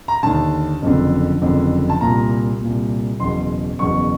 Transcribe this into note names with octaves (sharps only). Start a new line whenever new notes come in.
A#5
D#2 D3 A5
F#1 F2 D3
F#1 F2 D3
A5
C2 A#2 A#5
C2 A#2
F#1 E2 B2 C6
F#1 E2 B2 C#6